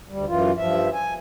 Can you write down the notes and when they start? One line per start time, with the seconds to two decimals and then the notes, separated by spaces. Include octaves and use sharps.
0.09 D2 G3
0.28 F#2 E3 F4
0.57 G2 F3 E5
0.93 G#5